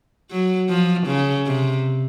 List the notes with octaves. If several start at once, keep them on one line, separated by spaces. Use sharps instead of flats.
F#3
F3
C#3
C3